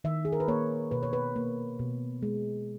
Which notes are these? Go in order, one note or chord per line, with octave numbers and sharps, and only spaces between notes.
D#3 E5
G#4
A#4
B4
A#3 C#5
B2 B4
C#5
B4
A#3
B2
G#3